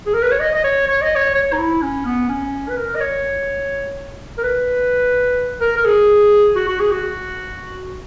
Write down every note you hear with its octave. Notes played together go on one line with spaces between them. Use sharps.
G#4
A#4
B4
C#5
D#5
D#5
C#5
C#5
D#5
C#5
C#5
D#4
E4
C#4
B3
C#4
B4
A#4
D#5
C#5
A#4
B4
A#4
A#4
G#4
F#4
F#4
G#4
F#4